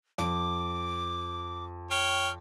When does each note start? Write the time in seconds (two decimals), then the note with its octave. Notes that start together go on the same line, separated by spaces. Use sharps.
0.18 F2 D6
1.91 C#5 G5 F6